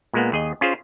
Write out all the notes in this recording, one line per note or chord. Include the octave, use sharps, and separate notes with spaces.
A#2 G#3 A#3 B3
D#2 G#4 D#5
C#4 F4 G#4 C5